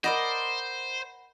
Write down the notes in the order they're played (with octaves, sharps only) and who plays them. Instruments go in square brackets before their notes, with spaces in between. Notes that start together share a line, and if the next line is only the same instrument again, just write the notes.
[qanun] A#4 D5 D#5 [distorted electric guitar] C5 [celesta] F#5 B5 A#6